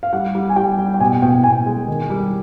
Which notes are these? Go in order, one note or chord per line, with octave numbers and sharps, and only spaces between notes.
F5
G3 F#5
G3
G#5
G3 G5
G3
G5
B2 G#5
B2 G5
B2 G#5
G#3
D#3
G3